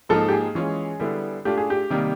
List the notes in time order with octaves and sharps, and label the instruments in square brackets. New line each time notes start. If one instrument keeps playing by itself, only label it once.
[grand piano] G#2 F3 A#3 D#4 [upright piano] A4
[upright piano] G4
G#4
[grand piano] E3 G#3 C#4 F4
D3 G3 B3 E4
[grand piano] A3 D4 F4 [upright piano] G4
[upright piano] G#4
G4
[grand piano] C3 D#3 G3 A#3